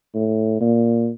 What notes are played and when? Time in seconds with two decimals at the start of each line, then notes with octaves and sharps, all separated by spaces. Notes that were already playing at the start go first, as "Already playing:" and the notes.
0.15 A2
0.61 A#2